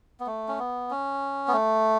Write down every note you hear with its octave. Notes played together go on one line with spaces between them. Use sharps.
B3
A3
C#4
B3
C#4
B3
A3